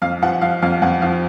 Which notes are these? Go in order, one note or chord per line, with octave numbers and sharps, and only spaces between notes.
F2 F5
F3 F#5
F3 F5
F2 F5
F2 F#5
F3 F5